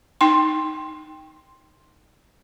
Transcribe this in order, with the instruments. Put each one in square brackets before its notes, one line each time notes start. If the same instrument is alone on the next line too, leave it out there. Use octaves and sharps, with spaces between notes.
[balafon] D#4 G5 C6